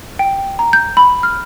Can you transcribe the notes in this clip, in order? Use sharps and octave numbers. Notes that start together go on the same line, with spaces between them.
G5
A#5
G6
B5
F6